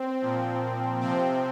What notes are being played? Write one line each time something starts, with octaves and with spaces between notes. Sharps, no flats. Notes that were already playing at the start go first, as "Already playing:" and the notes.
Already playing: C4
A#2 F3
C3 F3 C4